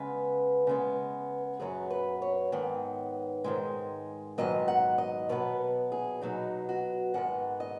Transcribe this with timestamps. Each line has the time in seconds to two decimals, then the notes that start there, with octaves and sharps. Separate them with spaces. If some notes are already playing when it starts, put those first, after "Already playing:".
Already playing: C#3 G#3 B3 B4
0.67 C#3 G#3 B3
1.60 F#2 F#3 B3 G#4
1.90 B4
2.22 C#5
2.52 G#2 D#3 B3
3.44 G#2 D#3 G#3
4.38 G#2 D#3 F#3 B3 D#5
4.68 F#5
4.98 D#5
5.29 B2 F#3 B3 B4
5.92 G#4
6.21 B2 F#3 B3 D#4
6.69 F#4
7.14 G#2 D#3 G#3 B3 F#5
7.60 D#5